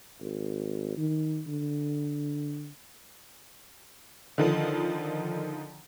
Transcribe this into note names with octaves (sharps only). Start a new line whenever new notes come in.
G#1
D#3
D3
D3 D#3 F3